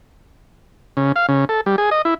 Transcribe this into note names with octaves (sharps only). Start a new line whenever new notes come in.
C#3
F5
C#3
A4
G3
G#4
D#5
E4